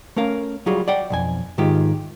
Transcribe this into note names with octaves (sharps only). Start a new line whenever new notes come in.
A3 C#4 A#4 F5
F#3 G3 F4 F#4 G#4
D5 F#5 G5
B1 F2 G#5
G#2 D#3 G#3 F4 G4